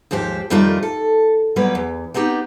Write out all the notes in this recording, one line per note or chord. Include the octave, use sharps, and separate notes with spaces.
D#2 G#2 F3 G4 C5
F2 D#3 G3 A3 F4 A#4
A4
G#2 F#3 G3 A#3 B3 B4
E2
B3 C4 D#4 G4